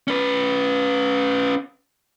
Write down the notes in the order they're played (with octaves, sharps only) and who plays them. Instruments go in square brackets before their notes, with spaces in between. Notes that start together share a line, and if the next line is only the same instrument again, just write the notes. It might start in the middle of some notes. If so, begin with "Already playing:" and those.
[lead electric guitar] C#4 B4